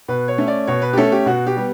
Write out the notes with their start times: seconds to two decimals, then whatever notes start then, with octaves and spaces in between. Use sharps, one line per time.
0.08 B2 B4
0.28 C#5
0.38 A3 C#4
0.48 D5
0.67 B2 C#5
0.82 B4
0.93 G4
0.97 A3 C#4 A4
1.12 G4
1.26 B2 F#4
1.47 G4
1.57 G3 B3